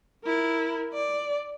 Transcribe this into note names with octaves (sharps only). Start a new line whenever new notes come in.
E4 A#4
D5